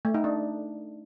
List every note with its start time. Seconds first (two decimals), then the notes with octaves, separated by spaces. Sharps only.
0.05 A3
0.14 D#4
0.24 D4